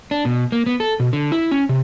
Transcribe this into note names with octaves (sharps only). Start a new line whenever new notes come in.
D4
B2
A#3
B3
A4
B2
D3
E4
C#4
C3